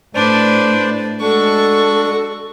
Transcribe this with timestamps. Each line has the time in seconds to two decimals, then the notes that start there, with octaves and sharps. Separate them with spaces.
0.15 A2 D4 B4 C5 D5
1.20 G#3 D4 F#4 A4 C#6